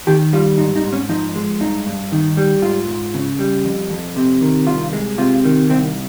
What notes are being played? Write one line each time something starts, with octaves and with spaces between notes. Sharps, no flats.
D#3 G4
G3 F4
G#2 D#4
D#4
G#2
C#4
F3 D#4
G#3
G2 D#4
G2
D#3 D#4
G3
G#2 F4
G#2
C#3
G3
F2
F2
C3
D#3
C2 F4
G#3
C3 F4
D#3
C2 C4